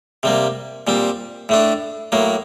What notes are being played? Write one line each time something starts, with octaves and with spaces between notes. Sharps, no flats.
C3 G3 A#3
A#2 G3 C4
A2 A3 D4
A2 F#3 A#3